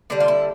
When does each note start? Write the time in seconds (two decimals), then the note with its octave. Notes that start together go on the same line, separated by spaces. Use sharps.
0.10 D3 G3 D4
0.20 F4
0.28 E4